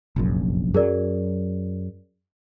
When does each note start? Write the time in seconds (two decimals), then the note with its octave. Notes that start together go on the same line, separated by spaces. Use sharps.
0.16 F1 A#1 F#2
0.74 F#2 F#3 G#4 A#4 D5